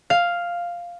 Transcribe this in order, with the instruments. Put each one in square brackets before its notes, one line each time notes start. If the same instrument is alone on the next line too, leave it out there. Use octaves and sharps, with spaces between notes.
[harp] F5